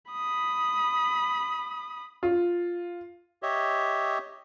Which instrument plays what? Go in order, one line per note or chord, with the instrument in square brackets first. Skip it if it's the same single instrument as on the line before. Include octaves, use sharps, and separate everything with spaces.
[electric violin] B5 D#6
[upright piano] F4
[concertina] G4 C#5 D#5 E5